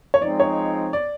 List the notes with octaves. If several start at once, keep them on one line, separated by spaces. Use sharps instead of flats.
C#5
F3 G#3 C4 D#4 D5
C#5
D5